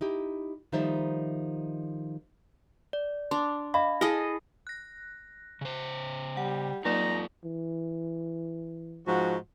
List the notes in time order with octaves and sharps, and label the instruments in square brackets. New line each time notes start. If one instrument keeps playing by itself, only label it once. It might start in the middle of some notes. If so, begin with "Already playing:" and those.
[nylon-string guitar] D#4 E4 G4
D#3 F3 G3 D#4 C5 E5
[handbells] D5
[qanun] D4 [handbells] C6
[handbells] D#5 F5 [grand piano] B5
[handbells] E4 [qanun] G#4 A4 D#5
[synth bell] F#6 A#6
[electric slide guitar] C#3 C5
[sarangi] G3 [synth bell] F#5
[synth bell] F#3 A#3 D5 [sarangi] D#4 [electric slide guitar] F4 A4 [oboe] A#5
[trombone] E3
[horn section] G#2 F3 F#4